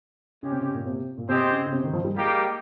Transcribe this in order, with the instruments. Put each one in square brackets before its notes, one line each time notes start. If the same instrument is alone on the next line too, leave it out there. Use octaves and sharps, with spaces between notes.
[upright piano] C#3 [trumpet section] G#3 C#4 G4
[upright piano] C3
C#3
A#2
C3
A#2
[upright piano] C3 [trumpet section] G#3 C4 G4 C5 D#5
[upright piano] C#3
C#3
C3
D#3
F3
G3
[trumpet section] G3 A#3 D#4 G4 [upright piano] G#3